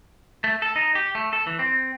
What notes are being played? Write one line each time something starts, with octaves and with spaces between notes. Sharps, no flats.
A3
A4
D#4
G4
A3
A4
E3
C4